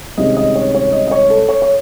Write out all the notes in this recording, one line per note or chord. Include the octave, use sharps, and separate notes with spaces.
C2 C3 D#3 G#3 C#4 D#5
D#5
C#5
C#5
D#5
D#5
C#5
A4
C#5
C#5